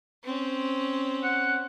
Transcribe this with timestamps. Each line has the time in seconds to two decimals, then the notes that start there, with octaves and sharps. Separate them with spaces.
0.24 C4 C#4
1.24 F#5